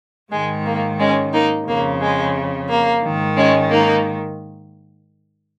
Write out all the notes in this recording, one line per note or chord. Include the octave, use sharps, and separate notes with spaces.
G#2 D#3 G#3
A#3
G#3 C#4
A#3 D#4
F2 C#3 A#3
G#3
A#3
G#2 D#3
G#3 C#4
A#3 D#4